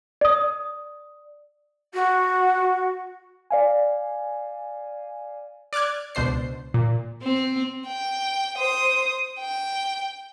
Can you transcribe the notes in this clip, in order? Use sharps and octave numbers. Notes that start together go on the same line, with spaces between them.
D5 D#6
F#4
D5 F5 G#5
D5 D6 F6 F#6 G#6
C#2 B2 D4 C5 C7
A#2
C4
G5
C5 D#6
G5